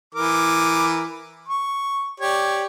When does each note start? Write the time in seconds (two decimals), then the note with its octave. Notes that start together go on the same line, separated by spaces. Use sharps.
0.15 E3 A#4 D6
1.48 C#6
2.20 G4 C#5 D5